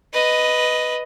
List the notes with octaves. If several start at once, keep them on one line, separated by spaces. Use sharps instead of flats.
B4 D#5